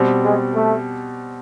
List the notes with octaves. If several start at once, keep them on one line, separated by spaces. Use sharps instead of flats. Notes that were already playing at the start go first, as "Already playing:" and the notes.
Already playing: B2 G3 C4
G#3
A3